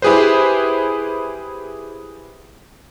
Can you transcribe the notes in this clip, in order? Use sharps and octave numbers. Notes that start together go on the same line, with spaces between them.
E4 G4 G#4 B4 C5